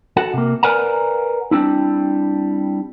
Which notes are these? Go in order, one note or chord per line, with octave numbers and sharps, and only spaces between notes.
F#4 A4 F#5
C3 A#3
A#4 B4 D5 F#5 G#5 A#5
G3 C4 D4 E4